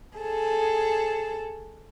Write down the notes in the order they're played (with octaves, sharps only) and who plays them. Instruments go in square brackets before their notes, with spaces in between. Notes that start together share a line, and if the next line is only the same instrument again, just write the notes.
[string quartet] G#4 A4